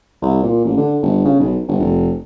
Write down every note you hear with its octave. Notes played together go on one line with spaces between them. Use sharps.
C2
A#2
A1
D3
G1
C#3
B1
G1
F1